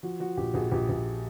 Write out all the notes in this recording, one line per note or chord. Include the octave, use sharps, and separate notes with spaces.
F3 F#4
F3 F#4
A#1 G4
A#1 F#4 G#4
A#1 G4
A#1